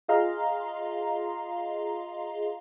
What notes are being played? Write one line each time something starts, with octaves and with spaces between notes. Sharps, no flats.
F4 G#4 D#5 F5 A#5 C6